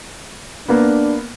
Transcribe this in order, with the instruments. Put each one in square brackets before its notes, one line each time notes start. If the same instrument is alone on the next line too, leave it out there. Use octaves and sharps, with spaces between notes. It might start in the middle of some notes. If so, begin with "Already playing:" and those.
[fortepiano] A#3 B3 [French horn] D4